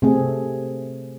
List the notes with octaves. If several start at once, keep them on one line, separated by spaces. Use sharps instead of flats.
C3 A3 C4 G#4